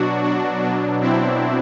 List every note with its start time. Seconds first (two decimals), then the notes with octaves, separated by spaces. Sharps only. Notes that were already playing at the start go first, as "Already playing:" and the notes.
Already playing: B2 F#3 D4 F#4
0.24 D4
0.63 B2 F#3 D4
1.01 C4 E4